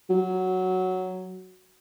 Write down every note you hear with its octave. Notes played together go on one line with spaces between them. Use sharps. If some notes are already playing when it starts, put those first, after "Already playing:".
F#3